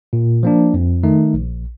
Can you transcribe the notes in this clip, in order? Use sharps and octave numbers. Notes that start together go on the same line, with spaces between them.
A#2
F3 A#3 D4
F2
D#3 A3 D#4
A#1